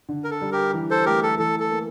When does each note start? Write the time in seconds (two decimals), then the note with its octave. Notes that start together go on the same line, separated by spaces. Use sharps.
0.09 D3
0.24 A#4
0.31 A4
0.42 G3
0.52 G4 A#4
0.74 E3
0.91 A4 C5
1.05 A3 G4 A#4
1.23 A4
1.39 E3 A4
1.60 A4
1.71 A#3